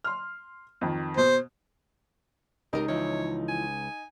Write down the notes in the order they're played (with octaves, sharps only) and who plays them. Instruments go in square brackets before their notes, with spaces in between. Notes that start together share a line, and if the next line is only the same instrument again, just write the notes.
[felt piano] C6 F6
F2 D#3
[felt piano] B2 [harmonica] C5
[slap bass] C#2 [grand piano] D#4 [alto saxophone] G4 [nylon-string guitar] A#4 D#5
[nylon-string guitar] E3 F3 [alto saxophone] C#5
[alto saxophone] G#5